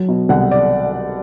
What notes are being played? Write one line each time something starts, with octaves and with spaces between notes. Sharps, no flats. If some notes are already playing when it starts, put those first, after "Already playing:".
Already playing: F#3
B2
C2 F#5
D5